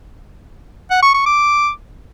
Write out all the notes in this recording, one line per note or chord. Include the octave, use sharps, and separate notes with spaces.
F#5
C#6
C#6
D6